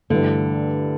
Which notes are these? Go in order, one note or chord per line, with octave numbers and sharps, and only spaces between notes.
G2 D3 E3 A3